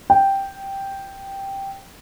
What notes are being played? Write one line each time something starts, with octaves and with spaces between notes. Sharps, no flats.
G5